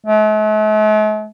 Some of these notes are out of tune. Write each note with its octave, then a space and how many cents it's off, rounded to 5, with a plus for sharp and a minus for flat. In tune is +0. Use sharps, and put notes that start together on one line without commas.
A3 -45